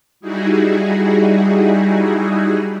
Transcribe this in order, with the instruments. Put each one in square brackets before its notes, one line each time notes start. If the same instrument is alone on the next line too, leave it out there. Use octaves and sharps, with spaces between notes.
[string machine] G3 D#4 E4 F#4 G#4